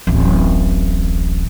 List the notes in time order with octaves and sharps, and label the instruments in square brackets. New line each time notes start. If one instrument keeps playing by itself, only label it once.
[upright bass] D1 A1